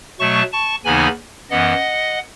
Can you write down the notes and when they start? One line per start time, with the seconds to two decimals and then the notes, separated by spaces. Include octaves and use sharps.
0.19 B2 F#3 A3 A5 C#6
0.52 A5 C#6
0.85 D#2 C#3 E3 B3 D#4 G#5 B5
1.50 F#2 E3 B3 D#5 F#5